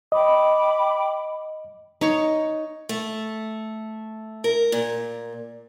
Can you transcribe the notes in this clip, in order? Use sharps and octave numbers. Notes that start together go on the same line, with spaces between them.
D#5 G5 B5 D6
D#4 C#5 C#6
A3
A#4
A#2